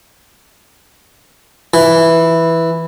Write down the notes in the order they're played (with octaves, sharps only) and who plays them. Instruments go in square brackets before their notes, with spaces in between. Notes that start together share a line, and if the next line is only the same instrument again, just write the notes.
[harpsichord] E3